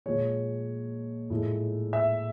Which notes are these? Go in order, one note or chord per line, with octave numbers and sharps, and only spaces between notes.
A#2 F3 G#3 C#5
A2 F3 G#3
E5